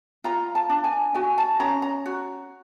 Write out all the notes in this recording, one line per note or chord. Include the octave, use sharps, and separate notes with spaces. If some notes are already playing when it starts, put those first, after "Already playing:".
F4 A#5
A5
D4
G#5
F#4 G#5
A5
C#4 A#5
A#5
F#4